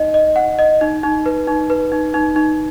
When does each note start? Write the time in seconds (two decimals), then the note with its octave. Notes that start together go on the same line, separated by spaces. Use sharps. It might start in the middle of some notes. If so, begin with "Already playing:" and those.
Already playing: D#4 D#5
0.14 D#5
0.36 F#5
0.59 D#5
0.81 D#4
1.03 D#4
1.26 B4
1.47 D#4
1.70 B4
1.92 D#4
2.14 D#4
2.36 D#4